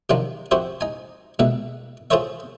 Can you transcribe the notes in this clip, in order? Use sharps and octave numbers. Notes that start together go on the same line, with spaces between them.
C3 D#3 F3 F#3 D4 F4
F2 F#4 G4 C5 E5
D#4 G#5
C#2 B2 D3 E5
F4 G#4 A4 C5 C#5 E5